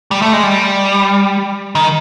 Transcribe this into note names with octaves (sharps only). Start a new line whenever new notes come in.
G3
A3
G#3
G3
D#3